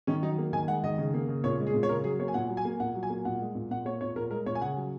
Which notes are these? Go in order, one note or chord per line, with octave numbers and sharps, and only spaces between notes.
D#3 C#4
F#3 D#4
A#3
D#3 G#5
G#3 F#5
D#3 D#5
C#3
A#3
C#3
A#2 C#5
G#3
G#4
A#2
C#5
C#3 A#4
F#3 G#4
A#3 C#5
G#5
A#2 F#5
F#3
G#5
A#3
A#2 F#5
F#3
G#5
A#3
A#2 F#5
G#3
A#2
A#2 F#5
A#3 C#5
A#2 C#5
A#2 A#4
G#3 A#4
A#2 C#5
G#5
C#3 F#5
F#3